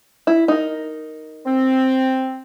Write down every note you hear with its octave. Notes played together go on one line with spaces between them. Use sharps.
E4
D#4 A#4
C4